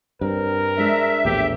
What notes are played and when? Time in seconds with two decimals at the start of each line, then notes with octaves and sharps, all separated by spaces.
0.21 G2 C4 A#4
0.78 F3 G#3 D4 E5
1.25 A#1 E2 A2 G4